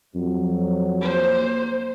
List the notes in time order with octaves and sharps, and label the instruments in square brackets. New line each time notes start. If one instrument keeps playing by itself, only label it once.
[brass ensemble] F2 F#3
[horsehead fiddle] A#3 C5